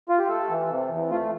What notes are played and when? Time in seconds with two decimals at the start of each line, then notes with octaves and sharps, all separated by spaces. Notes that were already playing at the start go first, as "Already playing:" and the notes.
0.09 F4
0.19 G4
0.29 A3 A4
0.50 E3
0.70 C3
0.90 E2
1.11 A3 F4